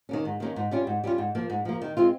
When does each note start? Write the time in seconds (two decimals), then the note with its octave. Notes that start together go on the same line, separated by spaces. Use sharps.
0.09 D#3 A#3 C#4
0.25 G#2
0.40 D#3 A#3 C#4
0.56 G#2
0.71 G3 C#4 F4
0.87 G#2
1.04 G3 C#4 F4
1.18 G#2
1.35 F3 A#3
1.50 G#2
1.65 F3 A#3
1.82 D#3
1.97 G#3 C4 F4